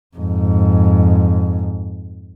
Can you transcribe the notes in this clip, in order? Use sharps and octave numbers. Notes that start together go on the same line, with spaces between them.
F2 G#2